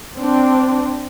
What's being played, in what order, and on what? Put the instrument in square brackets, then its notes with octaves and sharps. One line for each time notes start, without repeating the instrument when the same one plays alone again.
[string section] C4 D4